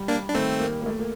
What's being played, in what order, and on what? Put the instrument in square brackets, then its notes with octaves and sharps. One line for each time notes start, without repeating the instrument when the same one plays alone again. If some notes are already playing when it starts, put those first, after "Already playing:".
Already playing: [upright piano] G3
[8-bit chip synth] A#3 D4
D4
[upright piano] D#3 [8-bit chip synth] A3 C4
[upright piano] A#3
A#3
A3
A#3